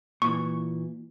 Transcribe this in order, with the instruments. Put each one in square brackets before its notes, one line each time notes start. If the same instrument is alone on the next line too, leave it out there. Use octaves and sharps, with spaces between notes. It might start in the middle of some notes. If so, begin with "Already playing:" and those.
[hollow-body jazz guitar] A#2 E3 [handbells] C#6